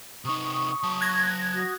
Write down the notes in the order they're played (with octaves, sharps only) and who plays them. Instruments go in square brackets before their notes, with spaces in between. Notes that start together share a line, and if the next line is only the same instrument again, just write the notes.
[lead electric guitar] C3 D#4 [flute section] C#6 D#6
[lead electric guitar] F#3 A5
[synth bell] F#6 G#6 A#6
[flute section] F#4 D#6